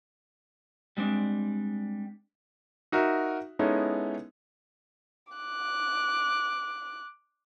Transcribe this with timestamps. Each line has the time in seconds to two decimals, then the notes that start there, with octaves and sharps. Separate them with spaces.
0.97 G3 G#3 C4 D4
2.92 D#4 F#4 A#4 E5
3.59 G#3 B3 C#4 D#4 E4 A4
5.33 D6 F#6